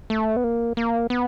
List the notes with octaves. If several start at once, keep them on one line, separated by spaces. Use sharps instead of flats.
A3
B3
A#3
A#3
B3